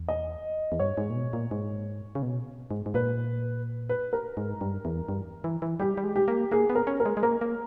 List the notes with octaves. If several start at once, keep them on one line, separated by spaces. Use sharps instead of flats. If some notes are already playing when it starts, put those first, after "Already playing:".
Already playing: E2
D#5
E2
G2 C#5
G#2
A#2
B2
A#2
G#2
C#3
B2
G#2
G#2
A#2 B4
B4
A#4
G#2
G2
E2
G2
E3
E3
G3 G4
G3
G#3
G4
A#3
A#3 G#4
B3
A#4
C#4
A#4
G#3
G#3
A#3 A#4
A#3